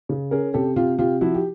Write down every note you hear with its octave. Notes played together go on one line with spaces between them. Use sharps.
C#3
C#4 G#4 A#4
C3 G4 A4
C3 F4 G4
C3 F4 G4
F3 E4 F#4
G4